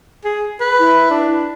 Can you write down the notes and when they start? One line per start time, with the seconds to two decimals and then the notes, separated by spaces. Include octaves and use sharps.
0.25 G#4
0.61 B4
0.79 E4
1.11 D4